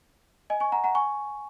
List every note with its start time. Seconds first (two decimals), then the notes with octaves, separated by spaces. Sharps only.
0.50 D#5 G#5
0.60 G#5 C#6
0.72 F#5 A#5
0.84 F#5 A#5
0.95 G#5 C#6